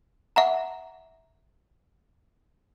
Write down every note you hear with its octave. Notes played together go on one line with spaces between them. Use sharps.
E5 F#5 A#5